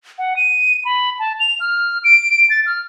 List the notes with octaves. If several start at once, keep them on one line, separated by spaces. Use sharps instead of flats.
F#5
D#7
B5
A5
F7
F6
D7
A6
F6